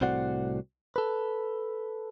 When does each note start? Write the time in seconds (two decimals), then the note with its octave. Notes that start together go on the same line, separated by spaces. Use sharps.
0.01 C2 A2 C4 F#4 D5 F#5
0.96 A4 B4